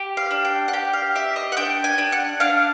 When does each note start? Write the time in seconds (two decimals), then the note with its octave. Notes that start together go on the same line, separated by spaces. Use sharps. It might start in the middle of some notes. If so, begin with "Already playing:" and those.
Already playing: G4
0.17 F5
0.31 D4
0.45 G5
0.68 F#5
0.73 G4 G5
0.93 F5
1.15 G4 E5
1.36 D#5
1.52 F#5
1.57 D4 G5
1.84 G#5
1.98 D4
2.12 F#5
2.40 D4 F5